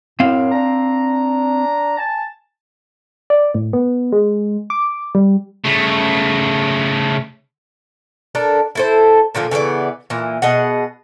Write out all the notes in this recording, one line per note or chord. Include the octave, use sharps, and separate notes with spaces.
F#2 A2 C4 F5
D4 A#5
G#5 A5
D5
A2
B3
G#3
D6
G3
C#3 A3
D4 A4 A#4
E4 A4 C5
A#2 D3 F3 A#3
C#3 E3 B3 D5
A#2 E3
B2 G#4 D#5 F#5